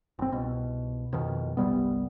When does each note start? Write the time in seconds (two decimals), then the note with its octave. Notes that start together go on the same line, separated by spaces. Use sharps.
0.19 G1 C4
0.32 C2 B2
1.13 F2 B2 D#3
1.57 G1 C2 G3 B3